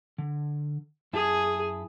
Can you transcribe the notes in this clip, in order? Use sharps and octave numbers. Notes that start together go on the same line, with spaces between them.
D3
F#2 E4 G#4 A5